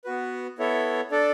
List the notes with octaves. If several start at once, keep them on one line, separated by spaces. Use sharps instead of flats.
B3 F#4 B4
B3 E4 A4 C#5 E5
D4 A4 D5